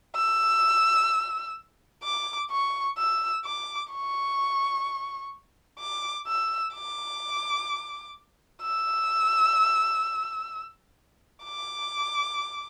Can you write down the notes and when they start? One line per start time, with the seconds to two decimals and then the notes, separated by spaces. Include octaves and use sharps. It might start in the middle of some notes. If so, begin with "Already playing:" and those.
0.16 E6
2.04 D6
2.51 C#6
2.98 E6
3.45 D6
3.92 C#6
5.80 D6
6.27 E6
6.74 D6
8.62 E6
11.44 D6